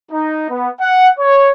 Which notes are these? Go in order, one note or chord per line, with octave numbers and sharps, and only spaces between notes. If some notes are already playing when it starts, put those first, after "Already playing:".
D#4
B3
F#5
C#5